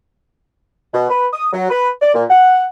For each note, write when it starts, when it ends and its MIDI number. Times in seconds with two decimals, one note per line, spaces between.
0.94 1.07 47
1.10 1.27 71
1.33 1.47 87
1.53 1.69 54
1.70 1.90 71
2.02 2.13 74
2.15 2.24 46
2.30 2.65 78